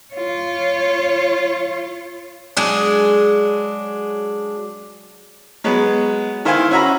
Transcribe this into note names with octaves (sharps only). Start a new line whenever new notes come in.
F4 C#5
F#3 G#3 D4
F#3 G#3 B3
D#3 E4 C5 F5 G#5
C#4 F#4 E5 A#5 B5